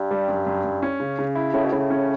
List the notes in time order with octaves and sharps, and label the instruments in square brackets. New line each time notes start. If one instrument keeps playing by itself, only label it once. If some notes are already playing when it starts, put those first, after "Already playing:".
Already playing: [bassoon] G2
[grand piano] G3
F#2
F#2
F#2
C#4
C#3
C#3
E4
[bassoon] A2 [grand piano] C#3
[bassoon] B2
[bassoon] A2 [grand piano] C#3
[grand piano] C#4